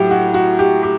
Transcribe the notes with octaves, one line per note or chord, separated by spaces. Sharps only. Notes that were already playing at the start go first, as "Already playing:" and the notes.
Already playing: A2 F#3 G4
F#4
F#4
G4
G4